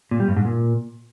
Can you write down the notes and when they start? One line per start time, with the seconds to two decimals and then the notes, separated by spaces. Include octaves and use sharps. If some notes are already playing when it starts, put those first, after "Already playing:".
0.11 A#2
0.20 G3
0.28 G2
0.36 G#2
0.45 A#2